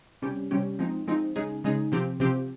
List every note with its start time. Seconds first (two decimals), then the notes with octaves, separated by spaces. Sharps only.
0.22 C3 G3 C#4 G4
0.51 C3 G3 C#4 G4
0.79 F3 G#3 C4 D#4
1.07 F3 G#3 C4 D#4
1.36 C#3 G#3 D#4 G#4
1.64 C#3 G#3 D#4 G#4
1.92 C3 F3 C4 G4
2.20 C3 F3 C4 G4